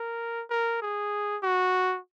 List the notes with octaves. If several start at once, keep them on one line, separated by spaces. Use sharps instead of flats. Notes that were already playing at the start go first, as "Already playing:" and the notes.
Already playing: A#4
A#4
G#4
F#4